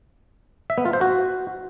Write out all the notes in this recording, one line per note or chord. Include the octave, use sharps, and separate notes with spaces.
E5
B3
F4
C5
F#4